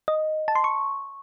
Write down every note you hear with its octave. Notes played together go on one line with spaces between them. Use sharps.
D#5
A5
C6
C#6